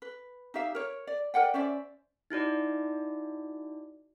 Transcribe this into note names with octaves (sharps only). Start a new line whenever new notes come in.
B4
D#4 G4 E5 F5
A#4 C#5
D5
A#4 D5 F#5 G5
C#4 C5 D5 E5
D#4 E4 F#4 D5